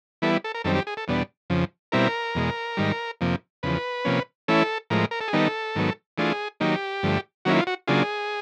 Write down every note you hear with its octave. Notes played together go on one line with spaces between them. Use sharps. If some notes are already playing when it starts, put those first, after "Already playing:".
E3 G3 B3 E4 A4
A4
A#4
F#2 D#3 G3 C4 A4
G4
G#4
A4
E2 B2 G3 B3 D4
F2 C#3 F3
B2 G3 C4 E4 A#4
E2 B2 G#3
G#2 D#3 G3
F2 C3 F3 A#3
E2 C#3 F3 B4
C3 F3 A#3 C#4
E3 A3 C#4 E4 A4
A2 F3 G#3 A#4
A#4
A4
G#4
D#3 G3 B3 D#4 A4
G#2 D#3 F#3 B3
E3 A3 D4 F4 G#4
D#3 F#3 A#3 D#4 G4
G2 D3 F3 A3
D#3 F#3 A#3 C#4 E4 F#4
F4
F#4
C#3 F#3 A#3 D4 F4 G#4